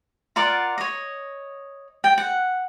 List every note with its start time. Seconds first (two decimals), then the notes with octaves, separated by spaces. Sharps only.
0.36 F4 A#4 D5 F#5
0.78 C#5 D#5
2.04 G5
2.18 F#5